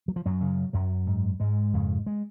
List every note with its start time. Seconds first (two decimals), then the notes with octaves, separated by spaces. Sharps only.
0.08 F#3
0.16 F3
0.25 F#2 F#3
0.41 F#2 C#3
0.73 F#2 F#3
1.07 G#2
1.40 G#2 G#3
1.73 F2 C#3
2.06 G#3